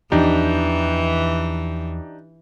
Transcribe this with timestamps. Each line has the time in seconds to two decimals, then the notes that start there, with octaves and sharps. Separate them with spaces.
0.12 E2 E3 F3 D4 D#4 G4